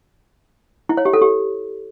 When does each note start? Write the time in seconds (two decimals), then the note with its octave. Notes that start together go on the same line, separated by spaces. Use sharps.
0.89 E4
0.97 C#5
1.05 G4
1.13 A4
1.21 G4